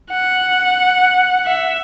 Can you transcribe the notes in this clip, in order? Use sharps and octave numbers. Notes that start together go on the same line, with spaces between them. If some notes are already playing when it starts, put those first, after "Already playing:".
F#5
E5